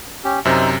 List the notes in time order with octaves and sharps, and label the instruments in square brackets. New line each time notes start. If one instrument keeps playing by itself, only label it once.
[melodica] C#4 G4
[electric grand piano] F#2 C3 [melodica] D#4 C5 E5